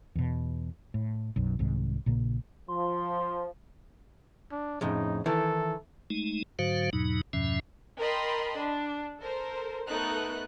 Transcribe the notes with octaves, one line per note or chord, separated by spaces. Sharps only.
E2 B2
A2
B1 F#2
C2 G#2 D#3
A#1 A#2 C#3 A#3
F3 C6
D4
F2 A2 C#3 D#4
D#3 E3 E4 A4
G#3 A3 D#4
G#2 D3 F#3 F#4 C5 F5
E2 G#2 B2 F#3 D#4
E2 G2 B2 F3 C#4 E5
A#4 D#5 G5 A5 B5 C6
D4
A4 A#4 C5
A3 B3 D#4 A4 A#4 F#6